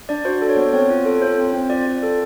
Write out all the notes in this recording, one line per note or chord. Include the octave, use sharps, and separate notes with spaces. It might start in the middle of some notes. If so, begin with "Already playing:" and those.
D4 D5
F#4 C5
A4
C#5
B3
C4 C#5
F4
A4
F4 C5
C4
C4
F4 D5
F4
A4